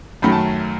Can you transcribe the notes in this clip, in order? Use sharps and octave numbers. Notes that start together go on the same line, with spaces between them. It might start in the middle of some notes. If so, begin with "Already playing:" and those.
F#2 D#3 F#3 A3 B5
A5